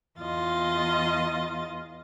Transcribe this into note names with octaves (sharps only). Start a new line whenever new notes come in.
E2 F4 D#5 A6